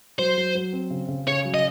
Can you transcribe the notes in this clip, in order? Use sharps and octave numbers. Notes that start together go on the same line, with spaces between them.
F#3 C5
F#3
F#3
C4
C#3
C#3
C#3 C#5
F#3
D#5